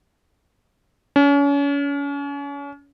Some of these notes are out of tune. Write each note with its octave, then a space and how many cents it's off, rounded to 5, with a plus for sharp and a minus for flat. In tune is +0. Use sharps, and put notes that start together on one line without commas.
C#4 +35